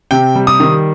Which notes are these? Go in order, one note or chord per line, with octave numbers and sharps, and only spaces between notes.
C3 G5
G3
D#6
D#3